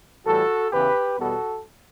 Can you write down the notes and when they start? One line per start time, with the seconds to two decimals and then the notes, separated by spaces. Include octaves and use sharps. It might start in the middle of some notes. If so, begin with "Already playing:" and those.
0.25 A2 E3 G3 F#4 A4
0.71 E2 C#3 E3 G4 B4
1.18 E2 B2 G3 B3 F#4 A4